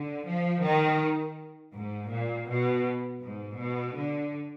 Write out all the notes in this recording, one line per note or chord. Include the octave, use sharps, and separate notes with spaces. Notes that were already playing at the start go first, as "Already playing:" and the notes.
Already playing: D3
F3
D#3
G#2
A#2
B2
G#2
B2
D3